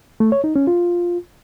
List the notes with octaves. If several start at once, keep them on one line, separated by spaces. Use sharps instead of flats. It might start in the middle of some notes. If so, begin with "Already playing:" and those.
A3
C#5
D#4
C#4
F4